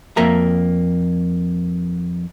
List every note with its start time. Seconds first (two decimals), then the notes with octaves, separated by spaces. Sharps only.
0.17 F2 A#3 E5 A#5